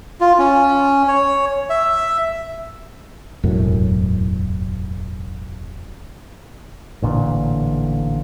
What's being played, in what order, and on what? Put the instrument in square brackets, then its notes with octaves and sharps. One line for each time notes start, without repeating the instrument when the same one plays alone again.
[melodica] F4
C#4
C#5
E5
[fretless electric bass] E1 C2 F#2 A2
[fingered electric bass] A1 A#2 D3